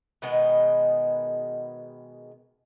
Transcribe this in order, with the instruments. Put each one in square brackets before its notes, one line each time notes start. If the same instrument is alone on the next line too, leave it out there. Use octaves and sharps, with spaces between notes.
[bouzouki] B2 D#3 G#3 B3